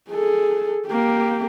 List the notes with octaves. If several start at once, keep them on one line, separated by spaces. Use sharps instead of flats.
G#4 A4
A#3 G4